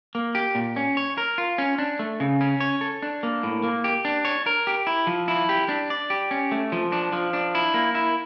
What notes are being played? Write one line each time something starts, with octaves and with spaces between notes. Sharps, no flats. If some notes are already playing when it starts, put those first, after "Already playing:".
A#3
G4
A#2
C#4
C#5
A#4
F4
C#4
D4
A3
C#3
C#4
C#5
A4
D4
A#3
A2
A#3
G4
D4
C#5
A#4
G4
E4
F3
E4
G4
D4
D5
G4
C#4
A3
F3
D4
F3
D4
E4
A#3
E4